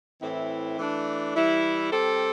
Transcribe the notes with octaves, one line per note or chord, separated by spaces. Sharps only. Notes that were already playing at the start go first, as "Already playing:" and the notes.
A2 E3 C4 E4
E3 A3 D4
E3 G3 E4
G3 C4 A4